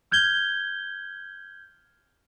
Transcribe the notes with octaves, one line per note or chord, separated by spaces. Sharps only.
F6 G6 G#6 G7